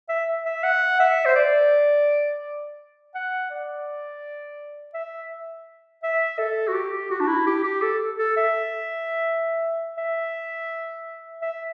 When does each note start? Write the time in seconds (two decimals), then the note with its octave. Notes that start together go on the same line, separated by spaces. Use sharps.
0.09 E5
0.45 E5
0.63 F#5
1.00 E5
1.25 C5
1.35 D5
3.14 F#5
3.51 D5
4.94 E5
6.03 E5
6.38 A4
6.68 F#4
6.74 G4
7.11 F#4
7.20 D4
7.27 E4
7.46 G4
7.64 G4
7.82 A4
8.18 A4
8.36 E5
9.97 E5
11.42 E5